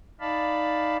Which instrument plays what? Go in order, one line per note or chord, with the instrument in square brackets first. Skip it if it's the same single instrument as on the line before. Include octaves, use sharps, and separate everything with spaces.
[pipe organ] D#4 D5 F5 A5 B5